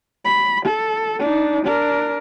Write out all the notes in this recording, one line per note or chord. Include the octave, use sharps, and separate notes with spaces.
B5
A4
D4 D#4
D4 A#4